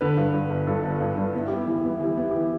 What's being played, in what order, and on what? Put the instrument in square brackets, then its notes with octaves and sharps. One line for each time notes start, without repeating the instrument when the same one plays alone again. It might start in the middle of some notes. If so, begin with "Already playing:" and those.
[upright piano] D3 [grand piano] B4
[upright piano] G2
G2
G1
[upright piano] G2 [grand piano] A4
[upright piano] G1
G2
G2
[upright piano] B3 [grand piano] E4
[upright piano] G3 [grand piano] G4
[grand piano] E4
[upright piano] E3
[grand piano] G4
[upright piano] B3 [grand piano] E4
[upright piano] E3 [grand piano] G4
[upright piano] B3 [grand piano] E4
[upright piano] E3 [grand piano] G4